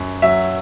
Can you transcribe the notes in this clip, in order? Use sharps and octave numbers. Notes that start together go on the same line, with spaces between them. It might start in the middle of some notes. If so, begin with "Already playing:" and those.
Already playing: F#2
F#3 E5